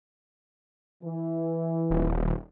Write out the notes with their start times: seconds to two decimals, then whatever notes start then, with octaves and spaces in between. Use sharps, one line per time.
1.03 E3
1.90 D#1